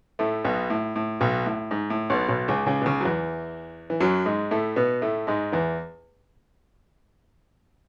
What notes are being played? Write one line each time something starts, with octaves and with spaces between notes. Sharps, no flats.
A2 A3
B1 B2
A2
A2
B1 B2
A2
G#2
A2
B1 B2
B1 B2
C#2 C#3
C#2 C#3
B2
C#2 C#3
F#3
E2 E3
E3
F#2 F#3
G#2 G#3
A2 A3
B2 B3
A2 A3
G#2 G#3
E2 E3